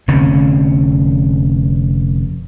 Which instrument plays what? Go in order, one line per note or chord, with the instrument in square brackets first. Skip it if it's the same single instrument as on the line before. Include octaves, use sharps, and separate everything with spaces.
[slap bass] F1 D3 C4 C#4